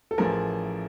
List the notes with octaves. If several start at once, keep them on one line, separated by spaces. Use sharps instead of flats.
A4
A1 A2 F3 G#4 A#4